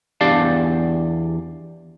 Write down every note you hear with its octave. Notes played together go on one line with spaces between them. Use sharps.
E2 D4 G4 D5 F5 A5